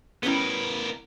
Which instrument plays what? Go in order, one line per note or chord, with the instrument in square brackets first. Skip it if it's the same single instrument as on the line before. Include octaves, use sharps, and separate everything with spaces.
[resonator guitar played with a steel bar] G3 C#4 B4 [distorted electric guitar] B3 A#4 [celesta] E4 G7